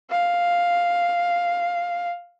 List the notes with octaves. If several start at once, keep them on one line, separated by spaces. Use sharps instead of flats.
F5